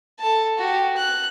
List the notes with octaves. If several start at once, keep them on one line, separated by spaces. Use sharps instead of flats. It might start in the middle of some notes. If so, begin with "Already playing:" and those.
A4 A5
F#4 G4
F#6